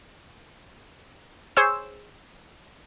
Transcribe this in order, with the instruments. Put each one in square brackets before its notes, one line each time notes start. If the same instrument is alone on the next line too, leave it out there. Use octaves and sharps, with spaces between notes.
[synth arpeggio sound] G#4 C5 C#5 E6 E7